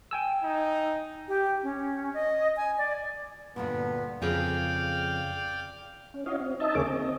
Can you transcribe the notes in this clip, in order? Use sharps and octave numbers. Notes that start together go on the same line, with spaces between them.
G5 G#5 E6
D#4
G4
C#4
D#5
G#5
D5
D2 G2 A#2 B3
F2 C#3 G#4 D5 F5 G5
C#4
C#4 E4 F#4 C#5 D#5 F5
C4
D#4 D#5 E5 A5
D#2 C#3 A#3 G#4 C#5 D6
C4 D#5